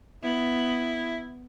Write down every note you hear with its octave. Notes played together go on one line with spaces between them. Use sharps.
B3 E4